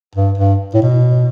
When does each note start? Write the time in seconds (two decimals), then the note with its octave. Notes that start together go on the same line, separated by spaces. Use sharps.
0.15 G2
0.38 G2
0.74 A2
0.82 B2